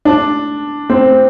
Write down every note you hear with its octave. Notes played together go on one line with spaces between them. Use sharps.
D4
C4